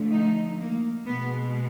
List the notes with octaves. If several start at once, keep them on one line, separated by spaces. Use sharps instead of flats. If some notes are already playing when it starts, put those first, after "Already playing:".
Already playing: D3 F3 A3
D#4
A#3
B2 G#3 B3